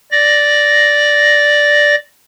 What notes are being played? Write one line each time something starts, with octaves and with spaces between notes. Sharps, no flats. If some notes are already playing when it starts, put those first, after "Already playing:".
D5 A#6